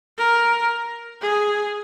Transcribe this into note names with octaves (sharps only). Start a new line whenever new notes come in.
A#4
G#4